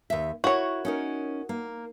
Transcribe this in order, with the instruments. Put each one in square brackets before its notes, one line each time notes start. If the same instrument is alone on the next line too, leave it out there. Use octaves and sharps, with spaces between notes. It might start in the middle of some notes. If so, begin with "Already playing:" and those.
[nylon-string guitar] D#2 E5
[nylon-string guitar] E4 A#4 [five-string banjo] F#4 C#5
[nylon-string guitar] C#4 D#4 A#4
A#3